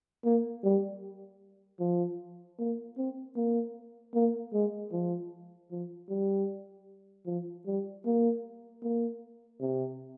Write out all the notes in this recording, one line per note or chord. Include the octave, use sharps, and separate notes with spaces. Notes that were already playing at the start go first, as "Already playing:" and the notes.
A#3
G3
F3
A#3
C4
A#3
A#3
G#3
F3
F3
G3
F3
G3
A#3
A#3
C3